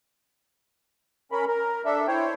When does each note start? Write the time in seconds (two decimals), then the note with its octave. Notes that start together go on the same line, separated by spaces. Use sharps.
1.32 C#4 A#4 B5
1.47 A#4
1.85 D4 A4 E5
2.08 E4 C5 C#5 G5